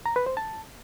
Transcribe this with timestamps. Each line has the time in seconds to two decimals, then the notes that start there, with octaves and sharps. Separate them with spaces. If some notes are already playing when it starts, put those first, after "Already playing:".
0.06 A#5
0.16 B4
0.26 C5
0.37 A5